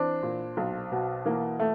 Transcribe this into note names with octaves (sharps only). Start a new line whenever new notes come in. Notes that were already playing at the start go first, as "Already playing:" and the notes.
Already playing: E3 C4 D4
A#2
B1
B2
E3 A#3
A3